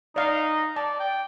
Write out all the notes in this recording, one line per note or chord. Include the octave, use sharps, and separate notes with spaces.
D#4 D5 F5
D5 A5
G5